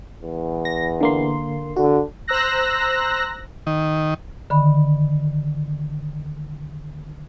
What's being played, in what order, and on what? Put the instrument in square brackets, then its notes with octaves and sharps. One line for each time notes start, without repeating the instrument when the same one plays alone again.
[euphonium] E2
[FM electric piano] A#6
D3 A#3 C6
[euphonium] D3 [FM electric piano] F#4
[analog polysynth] C5 A#5 E6 F#6 A#6
[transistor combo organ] D#3
[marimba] D3 D#3 B5